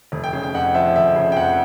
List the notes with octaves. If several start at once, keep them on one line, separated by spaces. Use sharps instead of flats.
F1
G5
C#3
G5
F2 F#5
F3 E5
F1 E5
C#3
G5
F2 F#5